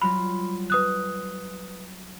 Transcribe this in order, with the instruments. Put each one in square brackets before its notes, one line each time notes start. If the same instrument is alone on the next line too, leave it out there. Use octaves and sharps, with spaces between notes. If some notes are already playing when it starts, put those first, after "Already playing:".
[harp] F#3 G3 F4 [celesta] B5
[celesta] B4 D#6 F#6